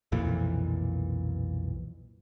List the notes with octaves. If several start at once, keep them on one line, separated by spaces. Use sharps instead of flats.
B1 F2 A#2 E3